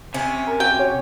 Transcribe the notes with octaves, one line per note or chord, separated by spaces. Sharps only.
C3 C#4
A#4
F#4 G5
C#5